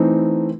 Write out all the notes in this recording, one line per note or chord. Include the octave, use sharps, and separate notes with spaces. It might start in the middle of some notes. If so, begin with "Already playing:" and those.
Already playing: E3 A3 C4 D#4